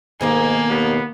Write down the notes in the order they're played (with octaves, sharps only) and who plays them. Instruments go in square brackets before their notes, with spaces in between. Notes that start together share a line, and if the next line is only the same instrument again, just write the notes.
[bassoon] G#2 [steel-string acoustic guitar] B2 D#3 A3 [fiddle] A#3 [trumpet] G#5
[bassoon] D#2 [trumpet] B3